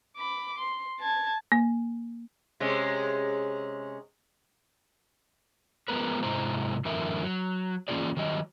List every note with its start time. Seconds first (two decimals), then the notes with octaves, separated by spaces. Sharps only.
0.17 B5 D6
0.58 C6
1.00 A5 G#6
1.52 A#3
2.60 C3 G#3 C#4
5.88 F3 G#3 A#3 B3 A#4 B4
6.23 G#2 C3 G#3 E4 C5 A#5
6.85 F#2 A2 D3 E3 A#4 E5
7.22 F#3
7.88 E3 A#3 C#4 F4 G#4 D5
8.17 D#3 F#3 G3 D#5